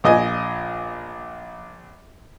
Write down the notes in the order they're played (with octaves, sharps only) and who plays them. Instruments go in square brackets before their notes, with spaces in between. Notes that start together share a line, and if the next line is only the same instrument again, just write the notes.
[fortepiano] A#1 D#5 G#5